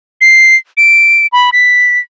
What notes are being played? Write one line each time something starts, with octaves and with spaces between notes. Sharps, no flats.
C7
D7
B5
B6